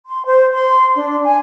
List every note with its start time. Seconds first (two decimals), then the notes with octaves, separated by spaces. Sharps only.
0.05 C6
0.24 C5
0.52 C6
0.94 D4
1.23 G#5